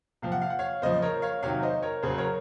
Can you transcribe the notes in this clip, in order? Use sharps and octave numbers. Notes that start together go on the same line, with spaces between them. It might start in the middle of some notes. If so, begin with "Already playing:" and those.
C3 F3 F5
F#5
F5
F#5
C#5 F5
C#3 F3 C5 D#5
A#4 C#5
C#5 F5
C3 D#3 F#3 C#5 F5
C5 D#5
A#4 C#5
C#3 F#3 G#4 C5
A#4 C#5